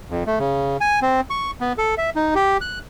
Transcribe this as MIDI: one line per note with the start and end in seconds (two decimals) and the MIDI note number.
0.10 0.23 41
0.26 0.39 57
0.39 0.77 49
0.81 1.00 80
1.02 1.21 60
1.30 1.51 85
1.61 1.73 59
1.78 1.95 69
1.98 2.10 76
2.16 2.34 63
2.35 2.58 67
2.61 2.79 90